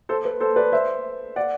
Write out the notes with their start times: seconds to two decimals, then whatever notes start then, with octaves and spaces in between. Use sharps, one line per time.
0.09 A4 C5
0.25 B4
0.40 A4 C5
0.56 B4 D5
0.72 C5 E5
1.36 D5 F#5